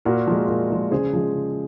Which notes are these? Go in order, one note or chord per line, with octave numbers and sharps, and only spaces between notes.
A#2 F#4 A#4
F3 G#3
A#2
F3 G#3
C#3 G#4 C5
F3 G#3
C#3